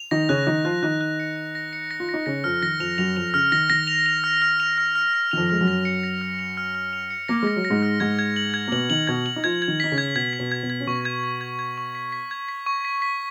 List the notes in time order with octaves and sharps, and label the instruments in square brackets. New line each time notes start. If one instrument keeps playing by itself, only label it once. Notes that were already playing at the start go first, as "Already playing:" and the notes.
Already playing: [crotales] F7
[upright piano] D#3 D#4 [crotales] A#6
[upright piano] C#3 C#4 [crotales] F#6
[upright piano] D#3 D#4 [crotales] F7
[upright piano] F3 F4 [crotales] F#6
[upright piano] D#3 D#4 [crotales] F#6
[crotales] F#6
C#7
F#6
A#6
C#7
A#6
[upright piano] F4
[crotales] A#6
[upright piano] D#4
[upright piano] C#3 C#4 [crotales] A#6
[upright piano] F2 F3 [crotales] F6
[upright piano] D#3 [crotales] A#6
[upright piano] F2 F3 [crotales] F7
[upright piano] F#2 F#3 [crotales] F7
[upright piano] F2 F3 [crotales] F7
[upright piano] C#3 [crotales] F6
[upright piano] D#3 [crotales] A#6
[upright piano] D#3 [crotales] A#6
[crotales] F7
F7
F6
F6
F7
F6
F6
F6
[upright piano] D#3 [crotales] F7
[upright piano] F2 F3
[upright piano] G#3 [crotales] F6
[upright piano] F#2 F#3
[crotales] A#6
C#7
A#6
F6
F7
F6
F6
F7
C#7
[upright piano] A#3 [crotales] A#6
[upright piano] G#3 [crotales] A#6
[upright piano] F#3
[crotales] A#6
[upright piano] G#2 G#3
[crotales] F6
[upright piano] G#2 G#3 [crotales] G#6
[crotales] G#6
F#7
G#6
[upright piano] A#3
[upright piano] B2 B3 [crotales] F#7
[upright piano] D#3 D#4 [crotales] F#7
[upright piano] B2 B3 [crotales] G#6
[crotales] F#7
[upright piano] D#4
[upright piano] F3 F4 [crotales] G#6
[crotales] G#6
[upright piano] D#3 D#4
[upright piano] D#4 [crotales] B6
[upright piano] C#3 C#4
[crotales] G#6
[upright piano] B2 B3 [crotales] G#6
[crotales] B6
[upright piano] B2 B3
[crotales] G#6
[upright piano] B2 B3
[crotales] G#6
[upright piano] C#4
[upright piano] B2 B3 [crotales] C#6
[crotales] G#6
G#6
G#6
G#6
C#6
B6
B6
G#6
B6
C#6
B6
B6